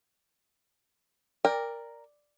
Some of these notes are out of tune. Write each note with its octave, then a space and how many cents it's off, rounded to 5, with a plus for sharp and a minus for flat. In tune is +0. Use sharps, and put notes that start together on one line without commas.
A#4 +0 D5 +0 G5 +30